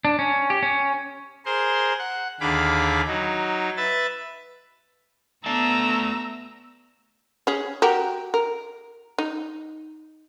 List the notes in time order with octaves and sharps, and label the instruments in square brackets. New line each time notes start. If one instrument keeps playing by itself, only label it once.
[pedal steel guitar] D4
C#4
G4
C#4
[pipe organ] G#4 A#4 C5 C6
F#5
D#2 D3 G#4 F5 B5 D6
F#3 D#4
B4 E5 A6
[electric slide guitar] A3 D5 A5 [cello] B3 [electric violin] A#5 E6
[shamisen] C#4 G#4
F#4 G4 A#4
A#4
D#4